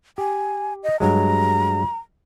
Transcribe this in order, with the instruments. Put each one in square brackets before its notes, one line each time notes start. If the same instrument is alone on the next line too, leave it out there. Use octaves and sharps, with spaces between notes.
[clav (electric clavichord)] G4 [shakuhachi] G#5
[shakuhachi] D#5
[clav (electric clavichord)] G2 F#3 G#3 [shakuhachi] A#5